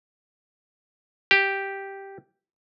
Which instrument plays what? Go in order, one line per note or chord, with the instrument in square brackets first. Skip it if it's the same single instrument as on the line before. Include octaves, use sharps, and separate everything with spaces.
[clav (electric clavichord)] G4